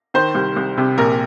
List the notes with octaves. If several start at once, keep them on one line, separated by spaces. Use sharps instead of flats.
D#3 C5
C2
C2
C3
A#1 A#4